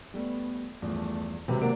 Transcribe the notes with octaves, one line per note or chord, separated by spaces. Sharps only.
G3 A3 B3
E2 G2 F3 A3
G#1 C3 F3 F#3 G4 B4
A#3 D4 A#4 F#5 D7